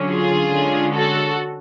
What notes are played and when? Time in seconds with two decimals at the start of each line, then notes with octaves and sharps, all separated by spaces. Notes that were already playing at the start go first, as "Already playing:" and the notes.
Already playing: D3 F#3 C#4
0.09 F4 G#4
0.51 D3 G#3 C#4
0.94 F#4 A4